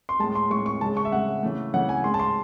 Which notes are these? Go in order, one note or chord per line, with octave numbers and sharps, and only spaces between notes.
C6
A2 G#3 A5
C6
A2 G#3 C#6
C#6
C#3 G#3 A5
C#6
E5
C#3 G#3 F#5
C#3 E3 A3
C#3 E3 A3 F#5
G#5
A2 G#3 C6
A5
C6